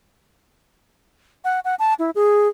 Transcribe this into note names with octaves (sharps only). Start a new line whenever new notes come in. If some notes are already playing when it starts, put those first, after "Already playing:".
F#5
F#5
A5
E4
G#4